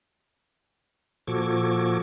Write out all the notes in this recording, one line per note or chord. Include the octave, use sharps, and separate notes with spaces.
A#2 F3 F#4 A4 D6 G#6